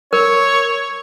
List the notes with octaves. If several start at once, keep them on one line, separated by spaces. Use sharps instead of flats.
A#4 C#5